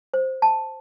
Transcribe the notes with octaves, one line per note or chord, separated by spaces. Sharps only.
C5
A5